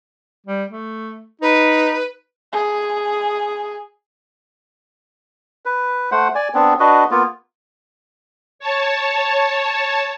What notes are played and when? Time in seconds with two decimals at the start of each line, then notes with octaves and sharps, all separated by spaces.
0.47 G3
0.69 A3
1.42 D#4 B4
2.52 G#4
5.65 B4
6.12 A3 C5 F#5
6.35 D5 G#5
6.54 B3 C4 D4
6.80 D4 F#4 B4 D#5
7.11 A#3 B3 F4
8.59 C#5 A5